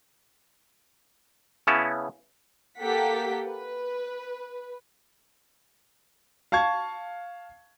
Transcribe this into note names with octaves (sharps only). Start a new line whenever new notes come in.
C#3 B3 C#4 E4 C#5 A5
A#3 G4 A4 F#5 G5 B6
B4
F5 A5 C#6 G#6